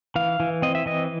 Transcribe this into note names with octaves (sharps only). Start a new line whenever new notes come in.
E3 F5
E3
C4 D#5
E5
E3 D#5